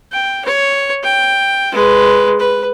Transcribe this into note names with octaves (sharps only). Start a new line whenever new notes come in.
G5
C#5
G5
G#3 B4
B4